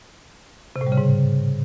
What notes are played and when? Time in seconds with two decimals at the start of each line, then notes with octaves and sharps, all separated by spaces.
0.76 C3
0.81 A2
0.87 G3
0.92 C#3
0.98 G#2